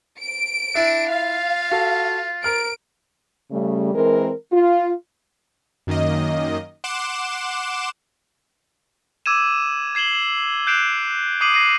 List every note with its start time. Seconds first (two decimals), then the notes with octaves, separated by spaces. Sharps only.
0.21 D7
0.75 D4 E4 E5
1.10 F4 F5
1.71 F#4 A4
2.44 A#4 F6 D7
3.51 C#3 G3 A3
3.94 E3 G#3 C4 A#4
4.52 F4
5.87 F#2 D#3 A#3 D#5
6.84 F#5 C6 D6 E7
9.26 D6 E6 G#6 D#7 E7
9.95 G#6 C7 E7 F#7 G7
10.11 E7 F#7
10.67 F#6 G6 C7 D7 E7 F7
11.41 D6 D#6 C7 D#7 F#7
11.54 F#6 A#6 C7 D#7